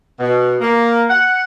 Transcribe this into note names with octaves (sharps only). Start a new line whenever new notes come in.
B2
A#3
F#5